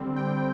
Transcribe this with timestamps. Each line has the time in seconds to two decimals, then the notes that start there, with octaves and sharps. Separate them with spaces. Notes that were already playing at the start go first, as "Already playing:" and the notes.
Already playing: D3 G3 C4
0.16 G5